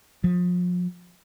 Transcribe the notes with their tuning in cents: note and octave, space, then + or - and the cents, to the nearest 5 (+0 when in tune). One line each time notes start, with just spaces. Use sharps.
F3 +35